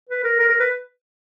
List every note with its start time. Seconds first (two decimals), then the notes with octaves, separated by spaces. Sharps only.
0.09 B4
0.24 A#4
0.39 A#4
0.49 A#4
0.60 B4